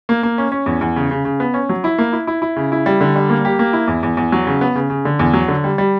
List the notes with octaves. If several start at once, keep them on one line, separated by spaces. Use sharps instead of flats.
A#3
A#3
C#4
C#4
E2
E2
C#3
C#3
C#3
B3
C#4
F#3
E4
A#3
E4
E4
E4
C#3
E4
G3
D3
G3
A#3
G4
A#3
E4
E2
E2
E2
F#3
C#3
B3
C#3
C#3
D3
E2
F#3
D3
G3
G3